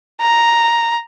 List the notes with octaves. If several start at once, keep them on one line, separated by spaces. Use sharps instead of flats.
A#5